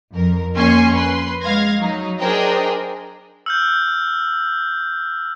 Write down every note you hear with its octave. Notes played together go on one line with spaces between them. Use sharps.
F2 A#4
F2 A#3 C#4 G#5 C6 C#6
B4 C6
G#3 F5 G#6 A#6
F#3 D#4
D4 G#4 A#4 C5 D#5 G5
E6 F6 G6